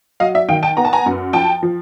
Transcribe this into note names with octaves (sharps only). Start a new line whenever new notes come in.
F#3 D#5 F5
D5 E5
D#3 F5 G5
G5 A5
B3 A#5
A5
G#5 A#5
F#2
F3 G5 A5
F3